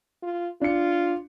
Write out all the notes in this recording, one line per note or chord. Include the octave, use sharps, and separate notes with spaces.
F4
D4 F4 C#7